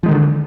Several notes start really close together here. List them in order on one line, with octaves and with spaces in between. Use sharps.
F3 G#3 D#3 D3